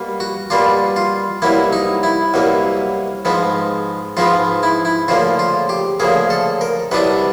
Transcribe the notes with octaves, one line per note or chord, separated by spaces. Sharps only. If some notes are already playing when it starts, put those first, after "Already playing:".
Already playing: B2 G3 A#3
F#4
B2 G3 A#3 D4 F4
F4
C2 B2 F#3 A#3 E4
D#4
E4
C2 B2 F#3 A#3
G#2 F3 G#3 B3
G#2 F3 G#3 B3 F4
E4
E4
D2 C#3 F3 A#3 F4
F4
G4
D2 C#3 F3 A#3 G#4
A4
A#4
C2 B2 F#3 B3 D4 B4